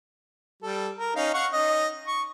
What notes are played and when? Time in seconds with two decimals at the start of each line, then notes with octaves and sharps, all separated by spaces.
0.63 G3 A4
0.98 A#4
1.16 C#4 D#4 F5
1.34 F5 F#5 C#6
1.52 C#4 D#4 D#5
2.08 C#6